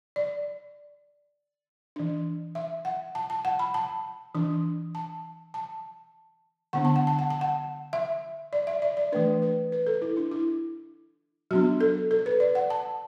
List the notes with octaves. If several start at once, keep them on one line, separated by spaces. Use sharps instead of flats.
D5
E3 D4
E5
F#5
A5
A5
F#5
B5
A5
E3 D4
A5
A5
D3 B3 D4 F#5
A5
F#5
A5
F#5
A5
F#5
E5
D5
E5
D5
D5
E3 A3 D4 B4
B4
B4
A4
E4
D4
E4
F#3 B3 D4 F#4
A4
A4
B4
D5
F#5
A5